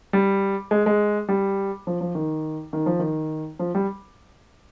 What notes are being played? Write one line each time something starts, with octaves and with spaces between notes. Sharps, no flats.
G3
G#3
G#3
G3
F3
F3
D#3
D#3
F3
D#3
F3
G3